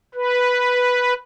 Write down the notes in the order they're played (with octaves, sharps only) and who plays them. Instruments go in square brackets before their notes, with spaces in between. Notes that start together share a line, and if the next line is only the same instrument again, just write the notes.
[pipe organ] B4